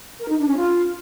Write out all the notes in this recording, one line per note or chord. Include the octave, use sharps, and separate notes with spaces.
A#4
D#4
D4
C#4
F4